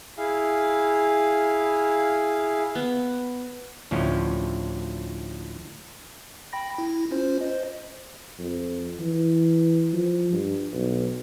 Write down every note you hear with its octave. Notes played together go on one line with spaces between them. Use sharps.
E4 G#4 F5
B3
D2 A2 F3 C#4
G5 B5 A#6
E4
C#4 F4 C5
C5 D#5
F2
E3
F3
G2
B1